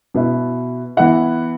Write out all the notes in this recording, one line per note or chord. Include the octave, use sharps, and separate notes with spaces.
B2 B3 E4
E3 B3 E4 F#5